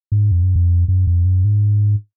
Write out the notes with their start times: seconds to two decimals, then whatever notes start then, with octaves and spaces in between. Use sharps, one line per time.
0.12 G#2
0.32 F2
0.43 F#2
0.56 F2
0.88 F#2
1.07 F2
1.25 F#2
1.45 G#2